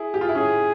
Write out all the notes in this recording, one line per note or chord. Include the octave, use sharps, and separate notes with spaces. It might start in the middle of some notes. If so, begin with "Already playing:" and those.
Already playing: E4 G#4
G4
F4
E4
C#4 G#4